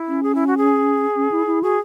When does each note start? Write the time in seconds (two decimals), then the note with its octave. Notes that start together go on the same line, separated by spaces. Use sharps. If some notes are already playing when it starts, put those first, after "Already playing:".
Already playing: E4
0.08 C#4
0.23 G#4
0.35 E4
0.47 F#4
0.57 G#4
1.16 C#4
1.31 E4
1.47 E4
1.63 F#4 G#4